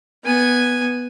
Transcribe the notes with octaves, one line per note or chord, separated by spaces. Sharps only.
B3 G#5